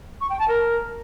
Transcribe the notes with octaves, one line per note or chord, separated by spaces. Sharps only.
C#6
G5
A5
A#4